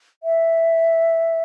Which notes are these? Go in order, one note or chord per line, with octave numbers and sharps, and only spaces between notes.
E5